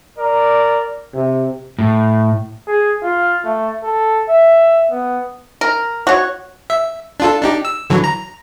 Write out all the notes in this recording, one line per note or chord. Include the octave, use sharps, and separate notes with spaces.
A#4 D5
C3
A2
G#4
F4
A3
A4
E5
B3
A#4
F#4 C#5
E5
D4 F4 A4
D4 D#4 G4
E6
D3 E3 F#3
A#5